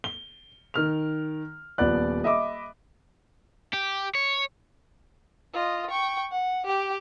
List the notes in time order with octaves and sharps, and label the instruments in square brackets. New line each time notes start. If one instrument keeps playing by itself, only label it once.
[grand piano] G7
D#3 F6 F7
D#1 F3 B3 D5 F#6
D#5 E5 B5 D6
[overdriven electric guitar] G4
C#5
[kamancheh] F4 D#5
G5 C#6
F#5
G4 G5